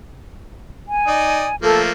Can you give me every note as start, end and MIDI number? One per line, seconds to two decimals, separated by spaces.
0.88 1.56 80
1.07 1.47 63
1.07 1.47 74
1.07 1.47 87
1.62 1.92 53
1.62 1.92 57
1.62 1.92 58
1.62 1.81 69